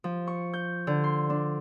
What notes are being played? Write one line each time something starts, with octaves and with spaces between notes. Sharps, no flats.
F3
C#6
G6
D3
C6
D4